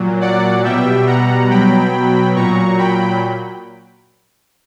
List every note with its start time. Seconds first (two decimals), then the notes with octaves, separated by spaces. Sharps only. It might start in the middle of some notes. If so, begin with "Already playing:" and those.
Already playing: A#2 F#3
0.21 D5 F#5
0.64 B2 G3 E5 G5
1.07 F#5 A#5
1.50 B2 F#3 G5 B5
2.35 A#2 F#3 A#5 C#6
2.78 G5 B5